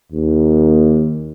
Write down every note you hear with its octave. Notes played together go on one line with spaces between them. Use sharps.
D#2